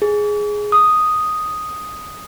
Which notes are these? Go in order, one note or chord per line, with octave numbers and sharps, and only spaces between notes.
G#4
D#6